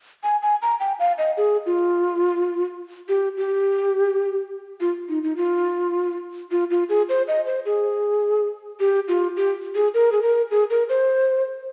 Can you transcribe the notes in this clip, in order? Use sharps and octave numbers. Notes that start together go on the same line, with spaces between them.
G#5
G#5
A#5
G5
F5
D#5
G#4
F4
G4
G4
F4
D#4
D#4
F4
F4
F4
G#4
C5
D#5
C5
G#4
G4
F4
G4
G#4
A#4
G#4
A#4
G#4
A#4
C5